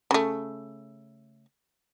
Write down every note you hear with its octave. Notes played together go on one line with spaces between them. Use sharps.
C#3 A3